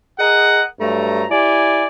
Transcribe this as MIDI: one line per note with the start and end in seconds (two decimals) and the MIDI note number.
0.20 0.62 68
0.20 0.62 70
0.20 0.62 75
0.20 0.62 78
0.81 1.25 43
0.81 1.25 54
0.81 1.25 57
0.81 1.25 82
1.31 1.86 64
1.31 1.86 67
1.31 1.86 74
1.31 1.86 80